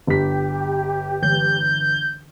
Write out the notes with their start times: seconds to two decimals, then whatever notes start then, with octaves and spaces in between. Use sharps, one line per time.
0.07 G1 G4 B6
1.23 D3 E3 G6